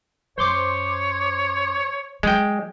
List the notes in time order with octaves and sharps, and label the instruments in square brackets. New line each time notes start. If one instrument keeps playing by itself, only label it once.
[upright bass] F#2 [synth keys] C5 C6 D6 [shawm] C#5
[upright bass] F#3 [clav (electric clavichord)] G#3 G5